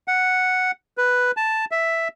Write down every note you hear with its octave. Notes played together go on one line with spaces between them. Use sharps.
F#5
B4
A5
E5